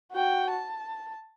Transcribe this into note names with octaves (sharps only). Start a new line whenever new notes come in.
F#4 G5
A5